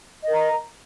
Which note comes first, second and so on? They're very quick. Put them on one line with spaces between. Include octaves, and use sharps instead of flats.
D#5 A#4 A#5